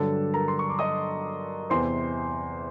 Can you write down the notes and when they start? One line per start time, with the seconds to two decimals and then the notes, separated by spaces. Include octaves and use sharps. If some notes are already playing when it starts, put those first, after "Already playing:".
Already playing: G2 D3 F#3 A4 A5
0.33 A#4 A#5
0.48 C6
0.59 C#6
0.69 D6
0.79 D#5 D#6
1.70 E2 C3 E3 C5 C6